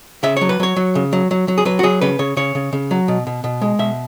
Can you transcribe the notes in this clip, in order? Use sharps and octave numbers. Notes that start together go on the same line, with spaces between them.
C#3 E5
F#3 C#5
B4
F#3 C#5
F#3
C#3
F#3
F#3
F#3
G#4
F#3 B4
F#4
F#3 G#4
C#3 B4
C#3 C#5
C#3 C#5
C#3
C#3
F#3
B2
B2
B2
G#3
B2 E5